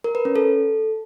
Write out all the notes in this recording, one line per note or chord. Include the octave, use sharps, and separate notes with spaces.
A#4
B4
C#4
A4